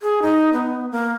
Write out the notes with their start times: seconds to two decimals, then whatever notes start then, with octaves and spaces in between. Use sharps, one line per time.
0.01 G#4
0.22 D#4
0.53 B3
0.91 A#3